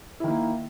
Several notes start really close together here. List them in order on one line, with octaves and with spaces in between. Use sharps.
E4 D#3 A#3